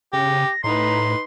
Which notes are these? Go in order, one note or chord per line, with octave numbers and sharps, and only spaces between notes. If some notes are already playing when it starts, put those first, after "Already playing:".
C#3 G4 A#6
A2 D#4 B4 A#5 C6